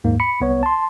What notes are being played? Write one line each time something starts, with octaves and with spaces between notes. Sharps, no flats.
D#2 G#2 A#3
B5 C#7
C2 B3 C#5
A5 C6